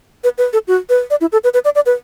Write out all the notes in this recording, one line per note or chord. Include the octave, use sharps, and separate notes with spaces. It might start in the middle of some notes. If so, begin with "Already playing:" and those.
B4
B4
A4
F#4
B4
D5
E4
A4
B4
B4
D5
D5
B4